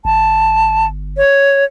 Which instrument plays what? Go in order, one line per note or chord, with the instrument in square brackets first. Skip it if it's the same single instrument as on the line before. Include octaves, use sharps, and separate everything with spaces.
[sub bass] G1 [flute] A5
[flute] C#5